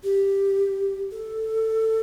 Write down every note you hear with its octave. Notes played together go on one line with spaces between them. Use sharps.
G4
A4